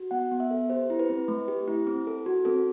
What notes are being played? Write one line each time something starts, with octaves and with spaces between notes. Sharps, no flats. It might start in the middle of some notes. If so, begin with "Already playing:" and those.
Already playing: F#4
B3 F#5
B3
E5
A4
G4 C5
E4
B4
C4
A3
G4
E4
C4
A4
F#4
C4 A4